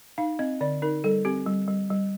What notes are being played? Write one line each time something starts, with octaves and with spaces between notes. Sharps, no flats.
D#4 F5
C4 D#5
D3 D5
D#4 A#4
G3 A4
C4 G4
G3
G3
G3